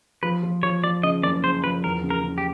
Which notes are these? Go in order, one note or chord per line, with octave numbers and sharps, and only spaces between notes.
F3 B4
F3
F3 C#5
F3 D5
C#3 D#5
F#1 D5
C#3 C5
F3 B4
E2 A#4
C#3
A#4
C#3
G4